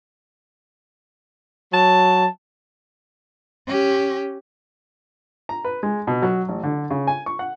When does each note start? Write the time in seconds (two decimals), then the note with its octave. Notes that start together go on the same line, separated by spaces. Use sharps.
1.73 F#3 A5
3.67 C#4 G4
5.49 A#5
5.64 B4
5.83 G#3
6.07 B2
6.22 F#3
6.49 A1
6.64 D3
6.90 C#3
7.07 G#5
7.26 C#6
7.39 F#5